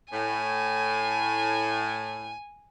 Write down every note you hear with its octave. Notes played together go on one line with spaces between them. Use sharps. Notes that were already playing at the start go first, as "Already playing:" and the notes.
A2 G#5